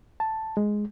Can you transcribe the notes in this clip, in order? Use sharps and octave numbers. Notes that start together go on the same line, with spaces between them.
A5
G#3